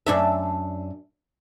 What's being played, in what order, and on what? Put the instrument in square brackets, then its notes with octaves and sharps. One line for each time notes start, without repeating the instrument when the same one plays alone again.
[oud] F#2 D4 E5